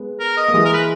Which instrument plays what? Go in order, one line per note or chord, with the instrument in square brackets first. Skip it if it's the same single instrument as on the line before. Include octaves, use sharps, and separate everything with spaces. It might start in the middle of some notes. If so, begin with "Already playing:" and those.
Already playing: [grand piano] G#3 B3
[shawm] A#4
D#5
[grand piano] A#3
[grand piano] E3 G#3 [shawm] D#5
[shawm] A#4
B4